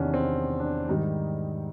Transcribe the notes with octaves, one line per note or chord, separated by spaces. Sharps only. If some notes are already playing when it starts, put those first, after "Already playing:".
Already playing: E2 C3 D#3 C#4 D4
C4
D4
G#2 D#3 G3 D#4